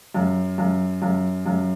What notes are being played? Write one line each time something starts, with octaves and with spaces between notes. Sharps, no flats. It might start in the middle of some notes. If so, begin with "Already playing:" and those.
F#2
F#2
F#2
F#2